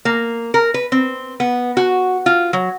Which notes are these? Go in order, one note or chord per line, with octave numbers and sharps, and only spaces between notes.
A#3
A#4
B4
C4
B3
F#4
F4
F#3